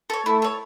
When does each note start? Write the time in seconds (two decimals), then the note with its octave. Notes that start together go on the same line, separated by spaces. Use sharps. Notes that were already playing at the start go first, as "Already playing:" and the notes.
0.10 A4 C#5
0.26 A3 E4
0.42 A4 C#5